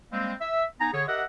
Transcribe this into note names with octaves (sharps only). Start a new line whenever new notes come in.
G3 G#3 A#3 C4
E5
B3 D#4 G#5 A#5
D3 G#4 C#5
G4 A#4 D#5 E5 F#5